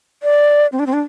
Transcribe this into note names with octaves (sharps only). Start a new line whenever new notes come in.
D5
C4
D4
C4
D4